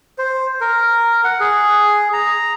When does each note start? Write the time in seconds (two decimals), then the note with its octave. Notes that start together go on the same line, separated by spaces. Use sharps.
0.18 C5
0.61 A#4
1.24 F#5
1.40 G#4
2.13 A#5